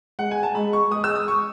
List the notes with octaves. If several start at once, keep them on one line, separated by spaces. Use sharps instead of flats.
G#3 F#5
G#5
A5
G#3 B5
C#6
G#3 D#6
E6
D#6
C#6